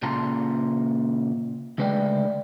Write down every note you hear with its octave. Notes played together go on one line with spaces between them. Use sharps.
A#2 C#3 F4 A5 A#5 C6
D2 C#3 G#3 B4 D5 G5